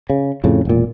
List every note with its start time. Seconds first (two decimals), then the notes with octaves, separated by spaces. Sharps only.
0.10 C#3
0.44 F2 A2 C#3
0.65 E1 A#2